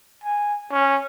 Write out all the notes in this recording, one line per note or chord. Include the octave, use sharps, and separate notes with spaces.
G#5
C#4